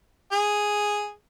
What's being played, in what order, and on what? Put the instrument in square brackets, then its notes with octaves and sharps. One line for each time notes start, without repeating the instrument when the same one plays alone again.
[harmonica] G#4